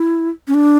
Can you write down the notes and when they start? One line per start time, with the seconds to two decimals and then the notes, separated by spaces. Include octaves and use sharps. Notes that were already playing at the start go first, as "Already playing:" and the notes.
Already playing: E4
0.48 C#4
0.54 D4